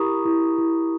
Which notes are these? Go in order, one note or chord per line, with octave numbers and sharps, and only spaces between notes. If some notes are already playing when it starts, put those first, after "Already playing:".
Already playing: E4 G4 A#4 A#5 B5 C#6 D#6
E4
E4